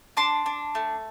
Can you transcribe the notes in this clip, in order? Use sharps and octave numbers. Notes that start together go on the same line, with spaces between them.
D4 A5 C6
D4
A3